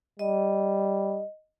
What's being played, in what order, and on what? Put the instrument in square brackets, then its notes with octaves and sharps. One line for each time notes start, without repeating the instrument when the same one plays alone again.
[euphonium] G3 [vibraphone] D#5